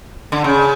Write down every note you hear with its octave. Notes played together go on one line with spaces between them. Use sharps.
D3
C#3